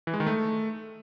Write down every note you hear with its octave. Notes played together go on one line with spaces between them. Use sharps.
E3
G#3
D#3
A3